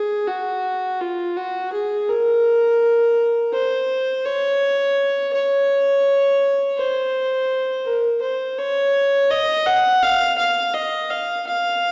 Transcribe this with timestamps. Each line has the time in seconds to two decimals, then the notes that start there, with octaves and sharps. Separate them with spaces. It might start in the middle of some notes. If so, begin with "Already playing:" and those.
Already playing: G#4
0.28 F#4
1.00 F4
1.36 F#4
1.73 G#4
2.09 A#4
3.53 C5
4.25 C#5
5.33 C#5
6.77 C5
7.85 A#4
8.22 C5
8.58 C#5
9.31 D#5
9.66 F#5
10.03 F5
10.38 F5
10.74 D#5
11.11 F5
11.47 F5